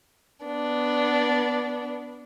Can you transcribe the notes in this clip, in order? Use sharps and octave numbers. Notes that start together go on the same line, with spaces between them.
B3 D4